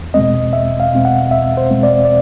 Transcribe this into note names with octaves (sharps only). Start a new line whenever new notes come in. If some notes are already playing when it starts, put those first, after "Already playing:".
Already playing: E2
B2 G#3 C4 D#5
E2 E5
F5
B2 G#3 C4
F#5
E2 E5
C5
B2 G#3 C4
D5
D5